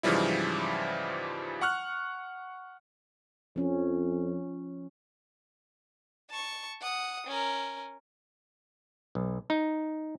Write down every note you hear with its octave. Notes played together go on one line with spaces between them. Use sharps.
G#2 C#3 E3 F3 G3 E4
F#5 C#6 F6 F#6
F2 F3 C#4
A5 C#6
F#5 D#6
C#4 A#4
B1
D#4